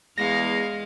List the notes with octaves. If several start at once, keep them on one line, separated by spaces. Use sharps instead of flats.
E2 G#3 F5 A#6